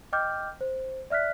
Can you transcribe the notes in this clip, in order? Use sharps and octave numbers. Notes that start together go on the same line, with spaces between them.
D#5 G5 D6 F6 G6
C5
D5 E5 F6 F#6 B6